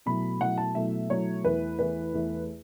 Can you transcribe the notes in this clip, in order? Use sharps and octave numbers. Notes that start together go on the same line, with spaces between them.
B2 F#3 A3 E4 B5
B2 F#3 A3 E4 F#5
A5
B2 F#3 A3 E4 E5
B2 F#3 A3 E4 C#5
E2 E3 A3 B4
E2 E3 A3 B4
E2 E3 A3